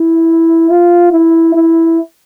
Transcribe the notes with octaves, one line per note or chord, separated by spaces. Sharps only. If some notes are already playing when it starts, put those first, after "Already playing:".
Already playing: E4
F4
E4
E4